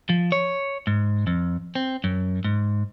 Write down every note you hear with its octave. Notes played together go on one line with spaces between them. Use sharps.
F3
C#5
G#2
F2
C4
F#2
G#2